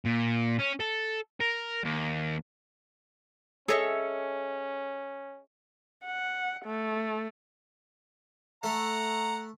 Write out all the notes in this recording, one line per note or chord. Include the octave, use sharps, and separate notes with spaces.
A#2
C#4
A4
A#4
D#2
C#4 G#4 A4 C#5 D#5 E5
F#5
A3
A3 F#5 A#5